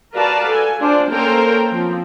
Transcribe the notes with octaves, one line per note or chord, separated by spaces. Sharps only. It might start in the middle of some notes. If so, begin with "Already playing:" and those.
F#4 A#4 B4 D5 F5 A5
A4 G#5
D4 F4 C5 D5
A#3 C#4 A4 A#4 C5 G5
F3 C4